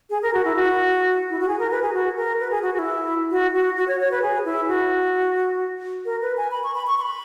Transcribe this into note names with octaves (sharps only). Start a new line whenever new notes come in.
G#4
A#4
F#4
E4
F#4
E4
F#4
G#4
A#4
B4
G#4
F#4
A#4
B4
G#4
F#4
F#4
E4
F#4
F#4
F#4
C#5
C#5
B4
G#4
E4
F#4
A#4
B4
G#5
B5
C#6
B5
C#6
C#6
B5